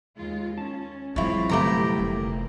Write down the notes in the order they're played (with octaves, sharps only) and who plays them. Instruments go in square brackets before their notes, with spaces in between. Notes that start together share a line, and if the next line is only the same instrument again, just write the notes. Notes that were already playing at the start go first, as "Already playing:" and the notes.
[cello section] D#2 G#3 F4
[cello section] C#4 [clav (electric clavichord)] A5
[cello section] G#2 C4 F4 [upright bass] E3 F#3 [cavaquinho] E4 C#5
[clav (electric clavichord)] G1 A3 [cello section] C3 [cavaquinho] E4 G4 A#5
[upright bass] F1 [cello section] A#3